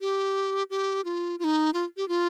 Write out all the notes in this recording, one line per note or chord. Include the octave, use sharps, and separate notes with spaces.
G4
G4
F4
F4
D#4
F4
G4
F4